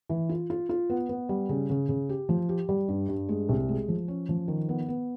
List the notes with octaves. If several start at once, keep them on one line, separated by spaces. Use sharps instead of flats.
E3
F4
F4
F4
B3
B3
G3
C#3
C#3
C#3
G4
F3
G4
G3
G2
G2
G#3
C2
G#3
F3
C#4
F3
D#3
B3
B3